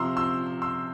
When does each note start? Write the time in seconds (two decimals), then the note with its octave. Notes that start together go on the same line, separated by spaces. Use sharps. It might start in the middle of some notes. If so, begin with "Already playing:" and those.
Already playing: C3 F3 A#5 C6 E6
0.17 C6 E6
0.62 C6 E6